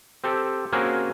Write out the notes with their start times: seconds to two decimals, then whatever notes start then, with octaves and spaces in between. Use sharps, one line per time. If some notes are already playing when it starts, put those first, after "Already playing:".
0.24 C4 G4 A4
0.73 A#3 C4 C#4 F#4 G#4 A#4